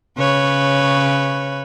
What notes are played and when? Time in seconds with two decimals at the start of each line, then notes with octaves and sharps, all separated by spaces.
0.18 C#3 B4 C#5